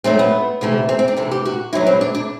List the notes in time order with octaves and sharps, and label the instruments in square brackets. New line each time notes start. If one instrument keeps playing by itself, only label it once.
[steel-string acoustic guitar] G2 F#3 A3 C4
B3
D2 C3 E3 A3
C4
C4
D4
D2 C3 E3 A4
G4
F#4
G2 F#3 B3 E4
C4
D4
D4